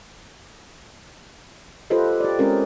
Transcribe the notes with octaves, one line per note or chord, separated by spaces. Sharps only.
F4 G4 A4 B4 C5 D#5
G4 D5
G#3 C4 C#4 G4 G#4 A#4